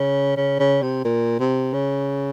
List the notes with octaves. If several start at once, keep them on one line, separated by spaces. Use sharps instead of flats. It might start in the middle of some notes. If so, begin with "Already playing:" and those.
Already playing: C#3
C#3
C#3
C3
A#2
C3
C#3